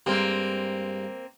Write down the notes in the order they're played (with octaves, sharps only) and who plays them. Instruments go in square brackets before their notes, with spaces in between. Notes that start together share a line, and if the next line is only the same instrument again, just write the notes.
[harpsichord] G2 G#3 [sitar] A#3 C4